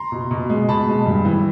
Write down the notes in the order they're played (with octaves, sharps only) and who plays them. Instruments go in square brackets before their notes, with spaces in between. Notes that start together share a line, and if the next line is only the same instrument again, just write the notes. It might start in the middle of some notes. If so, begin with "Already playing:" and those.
Already playing: [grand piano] A#5 C6
B2
B2
G#3
B2 A5 B5
G#3
G2
E3